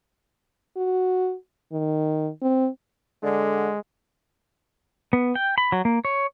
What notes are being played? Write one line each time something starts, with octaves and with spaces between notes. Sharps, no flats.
F#4
D#3
C4
D3 G#3
B3
G5
B5
F#3
A#3
C#5